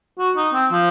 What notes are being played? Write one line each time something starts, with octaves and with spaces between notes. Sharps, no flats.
F#4
D#4
C4
F3